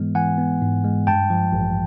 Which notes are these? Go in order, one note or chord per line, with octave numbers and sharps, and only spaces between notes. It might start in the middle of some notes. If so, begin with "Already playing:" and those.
Already playing: G#2 E3 G#3 B3
E3 F#5 G#5
B3
G#2
G#3
G2 G5 A5
F3
A1